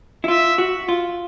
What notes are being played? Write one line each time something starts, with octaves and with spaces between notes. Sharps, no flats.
E4
F4 E5
F#4
F4